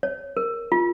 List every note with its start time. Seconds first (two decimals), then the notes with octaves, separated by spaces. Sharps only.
0.03 C#5
0.37 A#4
0.72 F4